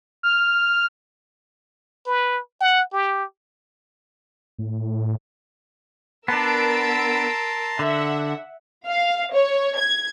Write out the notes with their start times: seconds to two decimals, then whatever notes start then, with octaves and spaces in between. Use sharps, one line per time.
0.23 F6
2.06 B4
2.61 F#5
2.93 G4
4.59 A2
6.28 B3 D4 A#4 A5 A#5 C6 E6 D7
7.79 D3 E5 F#5
8.87 F5
9.34 C#5
9.78 G#6